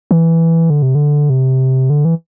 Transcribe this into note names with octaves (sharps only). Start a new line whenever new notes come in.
E3
D3
C3
D3
C3
D3
E3